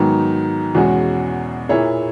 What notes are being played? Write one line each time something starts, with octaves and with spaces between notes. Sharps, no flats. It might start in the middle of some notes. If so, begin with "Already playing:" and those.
Already playing: G#2 D#3 F#3 B3
E2 B2 G#3 C#4 F#4
A#2 A#3 E4 G#4 C#5